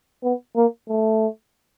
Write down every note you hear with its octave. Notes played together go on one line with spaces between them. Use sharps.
B3
A#3
A3